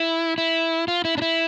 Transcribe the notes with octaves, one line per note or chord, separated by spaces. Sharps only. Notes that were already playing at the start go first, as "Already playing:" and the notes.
Already playing: E4
E4
F4
E4
D4
E4